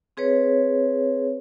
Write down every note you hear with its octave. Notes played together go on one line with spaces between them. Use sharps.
C4 G#4 B4 C#5